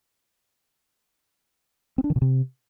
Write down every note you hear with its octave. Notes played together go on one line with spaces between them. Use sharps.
C4
D4
D#3
B2
C3